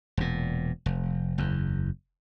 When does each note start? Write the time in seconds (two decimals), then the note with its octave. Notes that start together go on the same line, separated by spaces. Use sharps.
0.17 E1 A#2
0.86 F1
1.38 F#1 E2